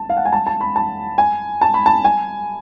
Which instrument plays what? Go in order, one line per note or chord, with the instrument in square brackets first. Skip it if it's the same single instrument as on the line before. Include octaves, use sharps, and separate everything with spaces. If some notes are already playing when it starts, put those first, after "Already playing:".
Already playing: [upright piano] A5
F5
F#5
G#5
A5
A5
B5
A5
G#5
A5
B5
A5
G#5